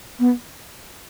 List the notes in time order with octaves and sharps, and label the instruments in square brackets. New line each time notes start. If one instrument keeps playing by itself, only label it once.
[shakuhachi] B3